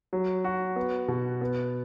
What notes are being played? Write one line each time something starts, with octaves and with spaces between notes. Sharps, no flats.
F#3
F#4
B3
B2
B3